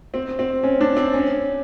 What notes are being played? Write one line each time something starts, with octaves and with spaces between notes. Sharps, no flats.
C4
C4
C#4
D4
C4
C#4